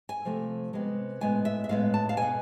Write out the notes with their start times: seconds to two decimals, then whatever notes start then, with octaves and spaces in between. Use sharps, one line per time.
0.09 G#5
0.25 C3 F3 A3
0.73 C3 G#3 B3
1.21 A2 G#3 B3 G#5
1.45 E5
1.64 E5
1.69 A2 G#3 B3 F5
1.94 A5
2.09 F5
2.17 B2 B3 G#5